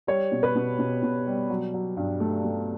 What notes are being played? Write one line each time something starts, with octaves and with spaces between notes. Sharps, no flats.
G3 C#5
B2
B4
B2
B2
B2
G3
F#3
F#3
G2
A3
A3